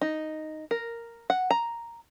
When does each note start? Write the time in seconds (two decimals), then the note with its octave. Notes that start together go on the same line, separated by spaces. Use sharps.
0.01 D#4
0.71 A#4
1.30 F#5
1.51 A#5